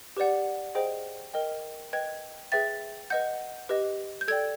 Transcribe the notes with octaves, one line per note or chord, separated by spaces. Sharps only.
G4 B4 D5 F#5
G#4 C5 D#5 G5
A#4 D#5 G5
B4 D#5 G5 G#6
G#4 B4 E5 G5 A6
B4 D#5 F#5 G6
G4 B4 D#5
G6
A4 D5 G5 G#6